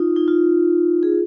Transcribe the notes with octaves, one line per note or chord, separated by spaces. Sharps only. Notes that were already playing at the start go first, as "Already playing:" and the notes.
Already playing: D#4 F4
D#4
F4
G#4